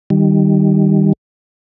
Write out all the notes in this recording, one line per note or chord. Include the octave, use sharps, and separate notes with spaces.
D#3 G3